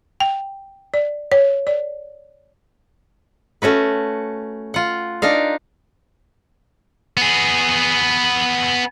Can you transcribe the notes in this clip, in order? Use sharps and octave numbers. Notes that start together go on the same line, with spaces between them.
G5
D5
C#5
D5
A3 C#4 F#4 B4
F4 F#5
D4 D#4 A#4 F5
B3 G#4